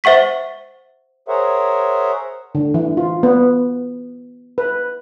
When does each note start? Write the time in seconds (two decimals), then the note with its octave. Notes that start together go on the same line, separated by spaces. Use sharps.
0.04 C5 E5 F#5 C#6 B6
1.28 G#4 A#4 C5 C#5 E5 F#5
2.55 D3
2.74 E3
2.97 F4
3.23 B3
4.58 B4